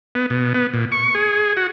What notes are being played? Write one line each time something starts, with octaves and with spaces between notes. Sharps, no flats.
B3
B2
B3
A#2
C#6
G#4
F#4